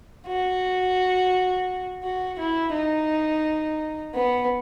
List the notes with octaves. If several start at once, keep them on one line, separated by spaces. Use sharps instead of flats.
F#4
F#4
E4
D#4
B3